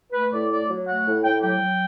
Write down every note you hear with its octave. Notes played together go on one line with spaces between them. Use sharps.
A3 B4
A2 D5
A3 D5
F#3
A3 F#5
A2
A2 G5
F#3 G5
F#3